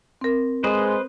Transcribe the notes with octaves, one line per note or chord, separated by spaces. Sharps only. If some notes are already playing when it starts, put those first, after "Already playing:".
C4 A#4
G#3 B4 C5 D#5